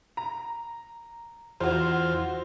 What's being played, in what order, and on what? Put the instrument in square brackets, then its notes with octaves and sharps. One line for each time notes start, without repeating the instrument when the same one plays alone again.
[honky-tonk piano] A#5
[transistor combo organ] E2 F4 [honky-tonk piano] F#4 C5